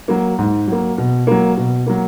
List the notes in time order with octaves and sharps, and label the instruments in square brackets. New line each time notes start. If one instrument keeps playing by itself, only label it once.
[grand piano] F#3 A#3
G#2
F#3 A#3
B2
F#3 A#3
B2
F#3 A#3